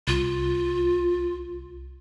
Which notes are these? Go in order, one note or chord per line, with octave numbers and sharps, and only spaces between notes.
C2 F4